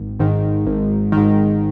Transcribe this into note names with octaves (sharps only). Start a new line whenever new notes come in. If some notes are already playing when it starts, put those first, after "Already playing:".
Already playing: G#1
G#2 D#3
G#1
G#2 D#3